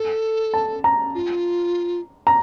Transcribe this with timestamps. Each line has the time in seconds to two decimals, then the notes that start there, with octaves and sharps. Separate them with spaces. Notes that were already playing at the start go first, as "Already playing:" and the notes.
Already playing: A4
0.54 A5
0.84 A#5
1.15 F4
2.27 A#5